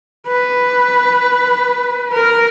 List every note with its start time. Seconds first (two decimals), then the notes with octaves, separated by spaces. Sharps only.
0.27 B4
2.13 A#4